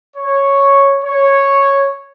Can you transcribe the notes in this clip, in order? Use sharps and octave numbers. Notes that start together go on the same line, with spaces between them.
C#5
C#5